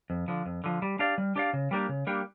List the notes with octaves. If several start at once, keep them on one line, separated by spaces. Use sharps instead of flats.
F2
D3 F3
F2
D3 F3
G3
D4 G4 D5 F5
G3
D4 G4 D5 F5
C#3
G3 A#3 D4 G4
C#3
G3 A#3 D4 G4